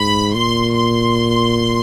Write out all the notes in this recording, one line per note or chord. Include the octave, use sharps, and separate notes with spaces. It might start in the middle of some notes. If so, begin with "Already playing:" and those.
Already playing: G#2 B5
A#2 C6
C6